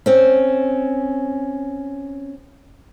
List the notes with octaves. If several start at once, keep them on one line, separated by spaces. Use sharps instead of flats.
C4 C#4